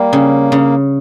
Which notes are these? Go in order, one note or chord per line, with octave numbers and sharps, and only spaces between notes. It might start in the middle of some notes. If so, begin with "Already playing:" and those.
Already playing: G3 A#3
C#3
C#3